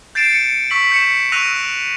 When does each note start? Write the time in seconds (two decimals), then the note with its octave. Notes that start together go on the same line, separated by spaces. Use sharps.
0.15 G6 A6 C7 D7 E7
0.33 C#7
0.70 C#6 E6 B6 F#7
0.91 G6 C#7 E7
1.32 C#6 E6 F#6 A#6 D#7 F7